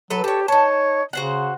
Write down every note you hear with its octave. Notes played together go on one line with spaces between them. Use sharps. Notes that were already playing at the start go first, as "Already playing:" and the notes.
F#3 A4 B4
G4 A4 C#5
D#4 C#5 A5
C#3 F#4 C5 F#5